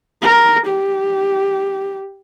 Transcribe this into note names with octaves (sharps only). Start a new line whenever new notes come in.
A#4
G4